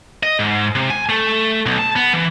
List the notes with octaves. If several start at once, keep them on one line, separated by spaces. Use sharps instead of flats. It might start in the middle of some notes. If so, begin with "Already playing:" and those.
D#5
G#2
C3
G#5
A3
B1
A5
B3
E3